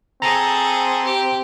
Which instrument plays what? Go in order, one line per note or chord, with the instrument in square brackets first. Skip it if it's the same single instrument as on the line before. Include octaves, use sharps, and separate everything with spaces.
[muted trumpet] C4 [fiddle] G#4 A4 [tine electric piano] A#5
[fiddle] G4